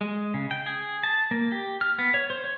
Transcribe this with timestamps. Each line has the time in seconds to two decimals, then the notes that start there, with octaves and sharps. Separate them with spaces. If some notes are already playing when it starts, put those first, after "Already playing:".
0.01 G#3
0.34 C#3
0.51 G5
0.66 G#4
1.03 A5
1.31 A#3
1.52 G4
1.81 F6
1.99 B3
2.14 C#5
2.30 C5
2.44 C#5